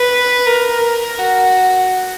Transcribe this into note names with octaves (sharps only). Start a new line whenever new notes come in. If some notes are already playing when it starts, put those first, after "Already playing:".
Already playing: B4
A#4
F#4